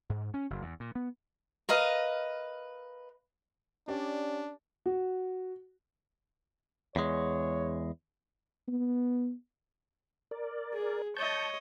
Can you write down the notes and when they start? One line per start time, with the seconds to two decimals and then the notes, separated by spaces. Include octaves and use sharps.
0.10 G#2
0.34 C#4
0.50 F#1
0.62 E2
0.80 A#2
0.95 B3
1.69 A#4 B4 D#5 F5
3.88 C#4 D4 G4 D5
4.86 F#4
6.96 E2 G#3 C#5
8.68 B3
10.31 A#4 D5
10.74 G#4
11.17 C#5 D#5 A5 C#6 G6